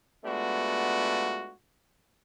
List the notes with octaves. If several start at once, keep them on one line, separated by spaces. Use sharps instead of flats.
G#3 A3 B3 D4 F4 F#4